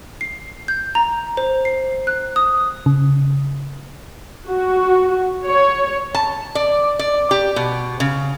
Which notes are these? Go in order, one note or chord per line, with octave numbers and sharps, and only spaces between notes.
C7
G6
A#5
C5
C7
F#6
D#6
C#3
F#4
C#5
A5
D5
D5
G4
B2
C#3